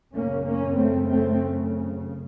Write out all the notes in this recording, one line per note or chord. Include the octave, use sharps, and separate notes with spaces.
F#2 C#3 A#3 C#4
A#3 C#4
A3 C4
A3 C4